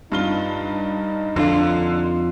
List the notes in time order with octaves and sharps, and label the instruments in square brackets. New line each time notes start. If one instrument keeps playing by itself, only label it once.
[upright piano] G2 F4 G7 [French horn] D#4
[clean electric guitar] F2 F3 F4 [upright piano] D3